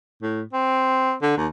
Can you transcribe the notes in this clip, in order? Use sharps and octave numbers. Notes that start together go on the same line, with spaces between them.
A2
C4
D3
D#2